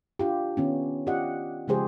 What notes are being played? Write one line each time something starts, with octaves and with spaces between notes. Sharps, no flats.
D4 F4 G4
D#3 B3 C#4
F4 G4 D5 D#5 F#5
C#3 F3 G#3 G4 G#4 C5